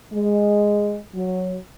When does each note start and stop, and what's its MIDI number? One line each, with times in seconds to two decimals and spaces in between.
0.13 0.97 56
1.15 1.57 54